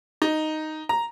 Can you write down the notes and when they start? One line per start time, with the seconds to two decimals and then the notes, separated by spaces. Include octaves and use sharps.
0.22 D#4
0.89 A#5